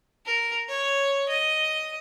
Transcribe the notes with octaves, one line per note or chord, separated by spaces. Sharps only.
A#4
C#5
D#5